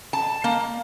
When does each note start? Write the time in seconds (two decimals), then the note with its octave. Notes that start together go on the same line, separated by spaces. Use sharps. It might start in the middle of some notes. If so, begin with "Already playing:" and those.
0.13 A5
0.44 A#3